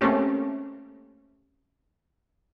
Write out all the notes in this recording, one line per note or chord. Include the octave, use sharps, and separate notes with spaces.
A3 A#3 C4 C#4 G4